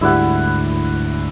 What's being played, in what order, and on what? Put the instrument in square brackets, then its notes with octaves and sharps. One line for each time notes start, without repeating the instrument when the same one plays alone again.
[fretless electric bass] D2 G#2 G3 [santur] E4 D5 F#5